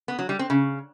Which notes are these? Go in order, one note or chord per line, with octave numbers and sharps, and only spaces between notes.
B3
F#3
G3
C4
C#3